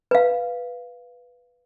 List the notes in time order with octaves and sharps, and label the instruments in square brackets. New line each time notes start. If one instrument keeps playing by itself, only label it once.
[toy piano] B4 F5